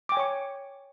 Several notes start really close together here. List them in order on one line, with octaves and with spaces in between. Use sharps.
D6 G5 G#5 C#5 C#6